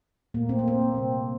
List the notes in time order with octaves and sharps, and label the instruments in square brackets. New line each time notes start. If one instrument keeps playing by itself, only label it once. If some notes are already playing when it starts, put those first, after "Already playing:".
[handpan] A#2 A3 A#3
C4
A#3
C4
C3 G3 A#3